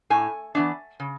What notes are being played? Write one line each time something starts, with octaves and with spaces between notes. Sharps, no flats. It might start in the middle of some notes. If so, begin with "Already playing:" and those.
A2 G#5
E3 B3 D4
C#3